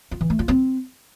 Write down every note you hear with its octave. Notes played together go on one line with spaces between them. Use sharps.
F4
E3
A3
F4
C4